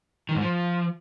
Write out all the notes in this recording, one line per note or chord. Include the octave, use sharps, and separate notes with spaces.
D#3
G#2
F3